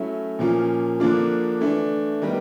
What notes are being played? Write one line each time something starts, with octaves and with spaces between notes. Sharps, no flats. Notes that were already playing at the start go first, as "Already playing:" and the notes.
Already playing: F#3 A3 C#4 E4
A#2 F3 A#3 C#4 F4
D3 F3 A#3 D4 F4
E3 A3 D4
D#3 G3 B3